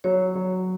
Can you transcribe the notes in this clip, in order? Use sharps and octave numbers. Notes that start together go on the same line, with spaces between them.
F#3 C#5
F#3